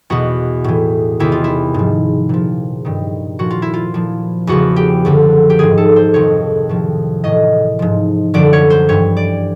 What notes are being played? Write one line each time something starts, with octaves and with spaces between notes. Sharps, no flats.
E2 B2 F#4
A2 E3
E2 C3 D#3 E4
F4
E4
G#2 F3
A#2 F3
G2 D#3
A#2 F3 F#4
F4
E4
F4
A#2 F3
E2 C#3 F3 F#4
G4
F#2 D3 F3
G4
G#2 D#3 G#4
A4
C5
F2 C3 D#3 C#5
A2 F3
A2 E3 D#5
G#2 F3
F#2 D3 F3 D5
C#5
C5
G2 E3 C#5
D5